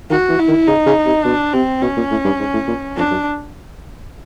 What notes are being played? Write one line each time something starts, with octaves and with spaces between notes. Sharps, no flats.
D#3 F#4
E3
E4
D#3
C#3 D#4
C#3
C3
B2 D4
C3 C4
B2 C#4
A#2
A2
G2
G#2
A2
A#2
F2 D4
F#2